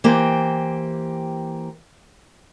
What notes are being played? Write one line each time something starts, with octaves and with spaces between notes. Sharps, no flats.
E3 A#3 G4 C5